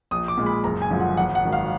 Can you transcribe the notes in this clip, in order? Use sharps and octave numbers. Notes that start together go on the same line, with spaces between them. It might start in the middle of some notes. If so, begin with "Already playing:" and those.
A#1 D#6
D6
A#2 G#3
B5
F#1 A#5
G#5
F#2 D3 F3 G#3
F#5
G#1 F#5
F#5
G#2 D#3 F#3
F5